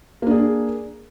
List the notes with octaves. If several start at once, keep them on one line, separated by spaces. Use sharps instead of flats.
A#3 D4 G#4